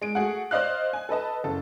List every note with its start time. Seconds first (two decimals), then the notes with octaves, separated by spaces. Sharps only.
0.01 G#3 D7
0.15 A3 F#4 G#4 F#5
0.51 C5 D5 D#5 F5 F#6
0.93 G#5
1.09 A4 B4 D#5 A5
1.44 F#1 A4